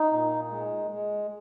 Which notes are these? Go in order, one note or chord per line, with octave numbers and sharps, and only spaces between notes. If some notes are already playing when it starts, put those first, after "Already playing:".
Already playing: D#4
A#2
G#3
G#3